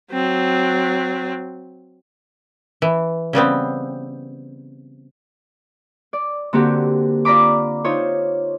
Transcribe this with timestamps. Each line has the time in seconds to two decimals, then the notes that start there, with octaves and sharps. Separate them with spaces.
0.12 F#3 C4
2.82 E3
3.33 C#3 G3 B3 C4
6.13 D5
6.53 D3 A#3 C4 F#4 G4
7.25 F4 D5 A#5 B5 D6
7.84 D#4 F4 C5 C#5